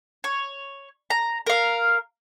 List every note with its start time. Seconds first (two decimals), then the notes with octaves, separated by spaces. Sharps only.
0.24 C#5
1.10 A#5
1.47 A#4 F5